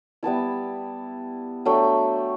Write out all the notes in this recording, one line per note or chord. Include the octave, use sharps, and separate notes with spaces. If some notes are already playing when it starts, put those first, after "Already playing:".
G3 B3 E4 A5
F#3 A3 D4 G5